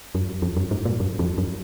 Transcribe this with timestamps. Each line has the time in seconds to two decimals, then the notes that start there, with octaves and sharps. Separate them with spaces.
0.15 F#2
0.42 F2
0.57 F#2
0.71 G#2
0.85 A#2
1.00 F#2
1.19 F2
1.38 F#2